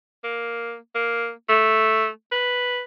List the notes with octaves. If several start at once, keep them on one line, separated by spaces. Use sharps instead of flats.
A#3
A#3
A3
B4